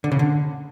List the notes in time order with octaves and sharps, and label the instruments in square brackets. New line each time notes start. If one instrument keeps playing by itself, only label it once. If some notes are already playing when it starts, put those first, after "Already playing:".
[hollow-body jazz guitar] D3
C#3
D3